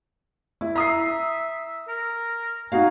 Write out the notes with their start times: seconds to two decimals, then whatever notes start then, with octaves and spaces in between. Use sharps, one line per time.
0.61 E4
0.76 E5 A#5 D#6 C7
1.88 A#4
2.72 D#4 F#4 F5 G#5